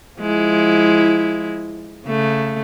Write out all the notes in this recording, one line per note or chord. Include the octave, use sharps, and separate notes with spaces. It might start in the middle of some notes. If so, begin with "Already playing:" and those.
F3 G#3 E4
C#3 A3